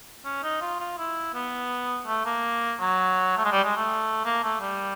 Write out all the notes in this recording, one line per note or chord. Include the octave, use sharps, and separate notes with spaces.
C#4
D#4
F4
F4
E4
B3
A3
A#3
F#3
A3
G#3
G3
G#3
A3
A#3
A3
G3